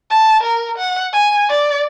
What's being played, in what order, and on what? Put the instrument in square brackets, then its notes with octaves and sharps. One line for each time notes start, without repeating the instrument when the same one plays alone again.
[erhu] A5
A#4
F#5
G#5
D5